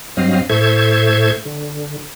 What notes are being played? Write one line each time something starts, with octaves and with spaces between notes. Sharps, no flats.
G2 F#3 C4 D#5 F5
A2 A4 C5 E5 C#6 G#6
D3